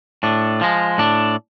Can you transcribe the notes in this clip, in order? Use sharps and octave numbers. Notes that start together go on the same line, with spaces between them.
A2 D4
F3 G#3
A2 D4